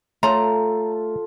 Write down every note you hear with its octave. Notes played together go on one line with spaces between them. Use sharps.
A3 F4 A4 C#5 A#5 C6